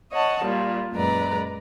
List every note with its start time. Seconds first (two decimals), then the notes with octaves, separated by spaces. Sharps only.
0.12 C#5 D#5 F#5 A5
0.43 A#2 G3 F4
0.92 F#2 A#2 G#3 B4 D5 A#5